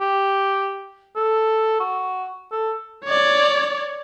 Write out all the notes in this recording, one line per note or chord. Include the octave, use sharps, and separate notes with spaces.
G4
A4
F#4
A4
C#5 D5